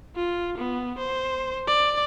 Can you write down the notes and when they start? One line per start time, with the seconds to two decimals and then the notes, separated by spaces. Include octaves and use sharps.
0.16 F4
0.58 B3
0.98 C5
1.67 D5